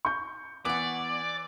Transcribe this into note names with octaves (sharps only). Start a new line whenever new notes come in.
C#6 G6
E3 B3 D5 F#5 D6